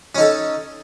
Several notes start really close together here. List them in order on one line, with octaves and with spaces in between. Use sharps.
C#4 D#4 A4